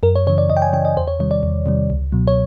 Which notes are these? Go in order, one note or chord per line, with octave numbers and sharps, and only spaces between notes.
F#2 A#4
C#5
C#3 E3 C#5
D5
F#2 D#5
G5
G#5
C#3 E3 G5
D#5
E2 C5
C#5
C3 D#3 G3 C#5
D5
E2
C3 D#3 G3
C#2
B2 F#3
C#5